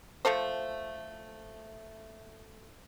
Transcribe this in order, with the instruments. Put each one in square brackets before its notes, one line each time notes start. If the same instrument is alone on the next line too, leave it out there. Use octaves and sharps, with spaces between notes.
[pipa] F3 A3 A4 C5